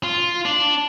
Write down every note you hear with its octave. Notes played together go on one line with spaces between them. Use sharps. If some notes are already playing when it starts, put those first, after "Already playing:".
F4
D4